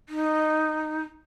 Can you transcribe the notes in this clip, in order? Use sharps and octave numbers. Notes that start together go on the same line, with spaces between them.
D#4